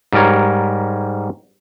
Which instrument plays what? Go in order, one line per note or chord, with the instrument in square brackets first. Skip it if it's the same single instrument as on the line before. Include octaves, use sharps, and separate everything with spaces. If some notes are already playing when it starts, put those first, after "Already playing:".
[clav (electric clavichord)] G#2 G3 A#4 C#5